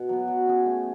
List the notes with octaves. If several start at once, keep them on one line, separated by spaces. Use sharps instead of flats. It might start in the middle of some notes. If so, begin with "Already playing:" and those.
Already playing: B2
F#3 B3
F#3
C#4 G#4
A3